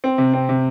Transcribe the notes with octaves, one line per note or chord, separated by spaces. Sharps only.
C4
C3
C4
C3